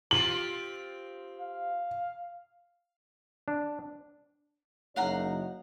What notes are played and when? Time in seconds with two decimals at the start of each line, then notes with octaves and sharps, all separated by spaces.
0.11 C4 F4 G4 F#7
1.41 F5
3.48 D4
4.96 F#1 D#4 C#5 F5 F#5 A#5